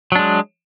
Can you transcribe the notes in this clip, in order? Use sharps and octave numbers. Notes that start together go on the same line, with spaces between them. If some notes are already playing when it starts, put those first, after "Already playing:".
F#3 G#3 D4